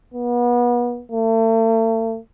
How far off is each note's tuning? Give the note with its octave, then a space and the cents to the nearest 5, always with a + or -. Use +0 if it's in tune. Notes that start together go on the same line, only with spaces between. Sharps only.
B3 -35
A3 +40